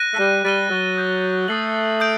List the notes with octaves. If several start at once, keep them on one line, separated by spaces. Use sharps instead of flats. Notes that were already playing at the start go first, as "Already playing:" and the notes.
Already playing: F#6 A#6 D#7
A3
G3
G3 A6 D#7 G7
F#3
D#6 G6 A#6 D#7
A3 D#6 A6 C7 F#7
D#6 G6 D7